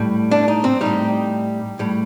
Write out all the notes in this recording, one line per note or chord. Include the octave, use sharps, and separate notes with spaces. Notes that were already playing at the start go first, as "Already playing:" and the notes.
Already playing: A2 G3
D4
D#4
C4
A2 G3 D#4
A2 G3